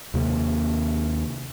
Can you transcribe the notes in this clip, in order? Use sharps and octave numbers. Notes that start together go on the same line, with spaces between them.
D#2 C3 A#3